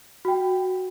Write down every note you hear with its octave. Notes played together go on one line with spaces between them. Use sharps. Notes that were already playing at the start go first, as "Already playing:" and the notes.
F#4 G5